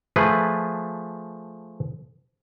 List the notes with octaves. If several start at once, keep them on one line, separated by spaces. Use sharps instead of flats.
F3 A3 G#4 B4